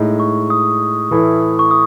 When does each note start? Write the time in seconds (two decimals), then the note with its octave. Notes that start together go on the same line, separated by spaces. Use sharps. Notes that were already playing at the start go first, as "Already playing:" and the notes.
Already playing: A2 G#3 D#4
0.20 C#6
0.50 D#6
1.11 A2 E3 A3 E4
1.59 C#6
1.71 D#6